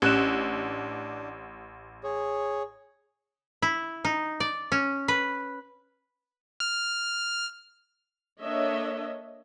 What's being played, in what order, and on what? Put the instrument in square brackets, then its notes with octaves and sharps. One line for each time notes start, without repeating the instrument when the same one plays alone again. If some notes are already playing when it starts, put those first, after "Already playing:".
[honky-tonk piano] A1 [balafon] C#4 [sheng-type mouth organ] D4 [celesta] G4 F#6 E7
[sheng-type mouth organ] G#4 C#5
[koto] E4
D#4
D5
C#4
B4
[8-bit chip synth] F6
[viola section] A#3 D4 A4 C#5 D#5 E5